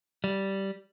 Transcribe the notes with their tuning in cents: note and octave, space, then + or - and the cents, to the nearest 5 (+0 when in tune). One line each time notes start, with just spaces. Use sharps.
G3 -10